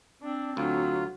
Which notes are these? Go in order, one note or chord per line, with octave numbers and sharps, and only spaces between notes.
C4 D4
D2 F#3 F4